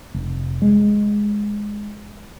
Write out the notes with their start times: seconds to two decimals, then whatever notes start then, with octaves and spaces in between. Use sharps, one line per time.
0.14 F1
0.62 G#3